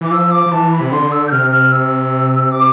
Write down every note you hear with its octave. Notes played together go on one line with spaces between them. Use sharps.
E3 D6
F3 E6
D6
F3
E3 A5
B5
C3
D3 C6
E6
G6
C3 F6
F6
E6
D6